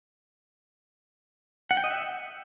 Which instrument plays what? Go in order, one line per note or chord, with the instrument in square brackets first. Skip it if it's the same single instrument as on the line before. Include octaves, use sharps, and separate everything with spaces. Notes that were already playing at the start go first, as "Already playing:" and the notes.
[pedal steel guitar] F#5
G5
D#5
E5